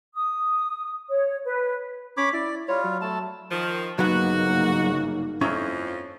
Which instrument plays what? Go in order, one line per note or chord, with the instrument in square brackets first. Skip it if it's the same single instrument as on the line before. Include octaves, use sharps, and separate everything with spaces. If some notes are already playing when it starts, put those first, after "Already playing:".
[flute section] D#6
C#5
B4
[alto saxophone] C#4 [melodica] C#5 B5 D6
[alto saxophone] E4 [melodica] D5
[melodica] G3 F4 [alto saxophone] C#5
[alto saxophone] F#3
[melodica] A3 A5
[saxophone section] D#3 F3
[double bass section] G1 C#3 A#3 [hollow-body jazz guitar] F#3 B3 [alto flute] D#4 [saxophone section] F#4
[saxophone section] F2 [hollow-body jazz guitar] C#4 E4 A#5